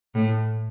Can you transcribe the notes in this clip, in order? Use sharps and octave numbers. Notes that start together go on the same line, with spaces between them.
A2